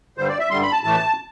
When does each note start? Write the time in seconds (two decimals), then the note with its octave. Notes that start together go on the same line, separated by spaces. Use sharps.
0.17 G2 D3 G3 C5
0.28 D5
0.39 E5
0.50 G2 D3 G3 C6
0.62 B5
0.72 A5
0.83 A2 E3 A3 A5